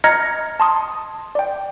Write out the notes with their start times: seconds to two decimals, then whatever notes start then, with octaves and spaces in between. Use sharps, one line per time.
0.04 D#5 A#5 F6 G#6 A#6 C#7
0.60 A5 C6 D#6
1.35 D5 G5